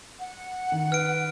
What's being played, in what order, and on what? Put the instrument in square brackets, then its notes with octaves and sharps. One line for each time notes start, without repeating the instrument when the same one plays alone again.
[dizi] F#5
[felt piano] D#3
[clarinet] B4 [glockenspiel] F6 D7